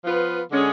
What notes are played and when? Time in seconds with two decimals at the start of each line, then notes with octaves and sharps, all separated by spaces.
0.03 F3 B3 F4 B4
0.50 D3 G#3 C#4 G#4